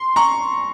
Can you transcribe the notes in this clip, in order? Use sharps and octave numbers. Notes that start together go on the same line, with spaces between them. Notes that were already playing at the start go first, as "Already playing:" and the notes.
Already playing: C6
A#5 C#6